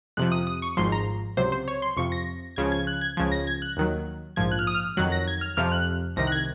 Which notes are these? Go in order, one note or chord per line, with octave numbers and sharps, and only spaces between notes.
F2 C3 F3 F#6
D#6
D#6
C#6
G#1 G#2 F3 C6
A#5
C#2 C3 F#3 C5
C5
C#5
C6
F2 C3 F3 C#6
A#6
C#2 C#3 F3 G#6
G#6
F#6
G#6
C#2 C#3 F3 G#6
A#6
G#6
F#6
D#2 D#3 F#3
A#1 G#2 F3 G#6
F#6
F6
D#6
F6
F2 D#3 F#3 F#6
A#6
G#6
F6
F2 C3 F3 F6
F#6
C2 C3 D#3 A#6
F#6
G#6